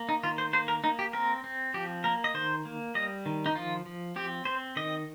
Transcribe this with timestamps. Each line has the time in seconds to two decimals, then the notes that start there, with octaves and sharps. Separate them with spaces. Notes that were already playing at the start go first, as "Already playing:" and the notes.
Already playing: A#3
0.09 D#4
0.23 D#3 F4
0.38 C5
0.53 A#3 C5
0.68 A#4
0.84 A#3 D#4
0.99 G4
1.13 C4 A#4
1.44 C4
1.74 F3 G4
2.04 A#3 A#4
2.24 D#5
2.34 D#3 C5
2.65 A#3
2.95 G3 D#5
3.26 D#3
3.46 D#4
3.55 F3 F4
3.86 F3
4.16 C4 G4
4.45 C4 C5
4.76 D#3 D#5